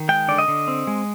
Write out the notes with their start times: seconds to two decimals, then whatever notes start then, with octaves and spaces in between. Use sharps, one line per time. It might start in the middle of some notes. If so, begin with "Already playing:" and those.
Already playing: D#3
0.09 G#3 G5
0.28 D3 D5
0.38 D#5
0.48 D3
0.68 C4
0.87 G#3